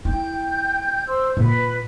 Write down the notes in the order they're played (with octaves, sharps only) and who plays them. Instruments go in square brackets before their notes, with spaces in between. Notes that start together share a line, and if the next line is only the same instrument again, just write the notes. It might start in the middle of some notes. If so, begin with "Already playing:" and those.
[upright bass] E4 [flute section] G5 G6
[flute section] C5 C6 E6
[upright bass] A#2 [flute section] B4